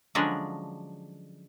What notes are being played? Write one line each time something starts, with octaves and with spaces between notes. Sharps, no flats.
D3 F3 F#3 G#3 C#4 D4